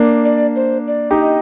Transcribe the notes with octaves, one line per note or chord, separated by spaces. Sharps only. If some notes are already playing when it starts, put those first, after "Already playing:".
Already playing: A#3 D4
D5
C5
D5
D#4 G4
D#5